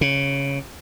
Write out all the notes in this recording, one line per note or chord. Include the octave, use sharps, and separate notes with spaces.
C#3